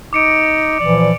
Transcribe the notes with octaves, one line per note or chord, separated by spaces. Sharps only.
D#4 D6 C#7 D7
A#2 E3 F3 D5